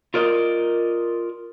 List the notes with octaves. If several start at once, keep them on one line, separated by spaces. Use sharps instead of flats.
F4 A#4 D5 D#5